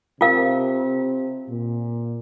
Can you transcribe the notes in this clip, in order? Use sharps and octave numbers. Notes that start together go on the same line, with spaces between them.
C3 F4 A#4 F5
A#2